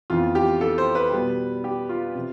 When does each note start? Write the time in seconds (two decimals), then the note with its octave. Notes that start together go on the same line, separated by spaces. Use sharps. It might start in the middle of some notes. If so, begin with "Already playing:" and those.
0.10 F2 E3 B3 F4
0.35 G4
0.61 A4
0.78 C5
0.95 B4
1.12 B2 G3 B3
1.64 G4
1.89 F4
2.15 C3 F3